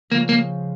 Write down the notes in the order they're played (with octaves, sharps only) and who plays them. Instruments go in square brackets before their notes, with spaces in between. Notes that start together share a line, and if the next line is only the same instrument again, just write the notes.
[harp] C#3 F3 G#3 C4 F4 [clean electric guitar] A#3
[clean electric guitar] A#3